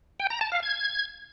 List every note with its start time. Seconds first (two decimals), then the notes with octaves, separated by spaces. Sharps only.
0.20 G5
0.30 A#5
0.41 A5
0.52 F5
0.63 G#6